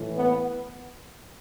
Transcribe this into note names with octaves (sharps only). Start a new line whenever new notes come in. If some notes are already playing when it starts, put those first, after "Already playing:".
Already playing: A2 E3
B3